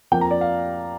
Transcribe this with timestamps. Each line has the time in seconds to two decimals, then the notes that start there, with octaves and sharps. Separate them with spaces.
0.11 F2 F3 A#3 G5
0.21 A#5
0.31 D5
0.41 F5